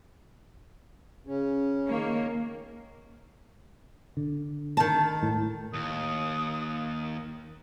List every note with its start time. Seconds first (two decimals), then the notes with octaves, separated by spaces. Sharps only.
1.27 C#3 C#4
1.87 D#3 A#3 C#5
4.17 D3
4.77 D#3 A5
5.23 A2
5.73 D#2 D#6